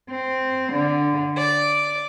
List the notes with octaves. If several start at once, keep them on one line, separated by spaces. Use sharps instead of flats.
C4
D3
D5